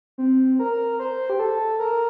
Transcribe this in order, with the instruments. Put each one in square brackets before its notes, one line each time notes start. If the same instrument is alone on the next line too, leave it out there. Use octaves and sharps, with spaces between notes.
[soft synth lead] C4
A#4
C5
G4
A4
A#4